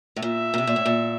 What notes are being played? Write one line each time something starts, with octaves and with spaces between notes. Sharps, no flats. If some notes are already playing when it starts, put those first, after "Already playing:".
A2
A#2 E5
A#2
C3
A#2
A2
A#2